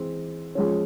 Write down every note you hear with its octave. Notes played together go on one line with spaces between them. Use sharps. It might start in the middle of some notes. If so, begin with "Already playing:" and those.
Already playing: E3 G#3 C4
F3 G#3 C#4